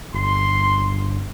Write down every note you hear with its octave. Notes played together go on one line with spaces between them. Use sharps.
G1 C6